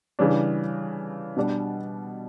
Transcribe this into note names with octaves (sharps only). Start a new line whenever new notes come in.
C#3 E3 G3 D4
B2 G3 D4